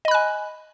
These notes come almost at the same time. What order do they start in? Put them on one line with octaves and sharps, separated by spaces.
D#5 B5 F#6 G#5